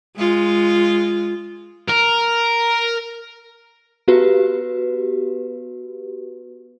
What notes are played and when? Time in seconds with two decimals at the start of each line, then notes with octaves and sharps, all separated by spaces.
0.17 G#3 F4
1.89 A#4
4.08 B3 F#4 G4 B4